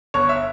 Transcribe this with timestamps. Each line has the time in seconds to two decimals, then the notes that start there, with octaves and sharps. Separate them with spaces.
0.14 G1 C#5
0.29 E5